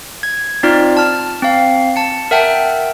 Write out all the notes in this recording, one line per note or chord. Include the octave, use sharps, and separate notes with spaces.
G#6
C4 D#4 F4 D5 F6
A5 F6
C4 F5
A5 C#7
A#4 E5 F#5 G5 A5